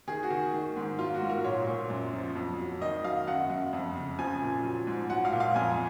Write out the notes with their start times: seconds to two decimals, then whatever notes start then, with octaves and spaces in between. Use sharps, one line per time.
0.07 D#3 G#4
0.23 F#4
0.30 D#3
0.53 D#3
0.76 G#2
0.99 F#3 F4
1.14 F#4
1.22 G#2
1.29 A#4
1.44 A#2 C#5
1.67 A#2
1.90 F#2
2.13 F3
2.36 F2
2.59 F#3
2.81 D#3 D#5
3.04 F#3 F5
3.27 F#2 F#5
3.50 F#2
3.73 F2
3.96 C#3
4.19 F3 G#5
4.42 A#2
4.64 F#3
4.87 G#2
5.10 F#3 F#5
5.25 F5
5.33 A#2
5.40 F5
5.56 F2 G#5